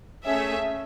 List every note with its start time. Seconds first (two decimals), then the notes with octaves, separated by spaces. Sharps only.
0.24 A3 C#4 G#4 E5